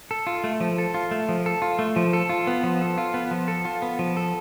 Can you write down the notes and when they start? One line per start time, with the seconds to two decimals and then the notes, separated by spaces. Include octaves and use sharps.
0.11 A4
0.27 F4
0.44 A3
0.60 F3
0.78 A4
0.94 F4
1.11 A3
1.29 F3
1.46 A4
1.62 F4
1.79 A3
1.96 F3
2.13 A4
2.29 F4
2.47 B3
2.63 F3
2.81 A4
2.98 F4
3.14 B3
3.31 F3
3.48 A4
3.65 F4
3.82 B3
3.99 F3
4.17 A4